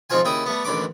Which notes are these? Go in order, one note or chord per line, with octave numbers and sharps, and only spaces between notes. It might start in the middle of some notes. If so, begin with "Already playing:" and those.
F2 G#2 F3 C4 F4 G#5
D#2 C#3 E4 G5 D#6
G3 A3 B3
A1 D#2 D3 B5 D6